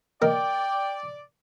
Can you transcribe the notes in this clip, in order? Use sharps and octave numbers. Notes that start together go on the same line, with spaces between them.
A#3 A#4 D5 D#5 G5